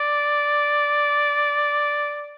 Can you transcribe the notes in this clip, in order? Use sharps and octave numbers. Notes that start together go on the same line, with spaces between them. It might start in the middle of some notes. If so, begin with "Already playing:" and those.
Already playing: D5